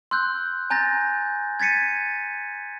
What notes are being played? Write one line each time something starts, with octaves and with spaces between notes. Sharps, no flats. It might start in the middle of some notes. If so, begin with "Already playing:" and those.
C6 E6 F#6 G6
G#5 A#5 G6 A6 A#6
G#6 A6 B6 C#7 D#7